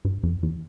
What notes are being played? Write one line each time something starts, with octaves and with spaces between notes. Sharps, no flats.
G2
F2
E2